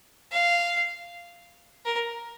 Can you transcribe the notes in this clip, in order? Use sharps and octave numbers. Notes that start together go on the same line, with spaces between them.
F5
A#4